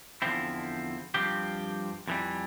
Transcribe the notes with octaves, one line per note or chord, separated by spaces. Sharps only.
E2 D3 F3 C4 E4
G2 F3 C4 G4
F2 E3 G3